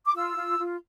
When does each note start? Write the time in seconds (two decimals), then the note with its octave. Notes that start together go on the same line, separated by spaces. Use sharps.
0.05 D6
0.15 F4 E6
0.37 F4
0.58 F4